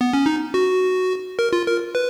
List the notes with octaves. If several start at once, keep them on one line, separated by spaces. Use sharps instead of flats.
B3
C#4
D#4
F#4
A#4
F4
A#4
B4